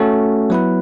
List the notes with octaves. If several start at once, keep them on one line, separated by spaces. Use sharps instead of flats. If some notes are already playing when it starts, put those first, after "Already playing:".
Already playing: A3 C#4 F#4 A4
F#3 B3 E4 B4